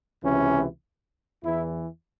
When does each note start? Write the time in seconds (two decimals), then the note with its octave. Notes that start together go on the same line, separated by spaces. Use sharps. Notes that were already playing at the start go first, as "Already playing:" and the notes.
0.23 C#2 C3 E3 C#4
1.43 E2 E3 E4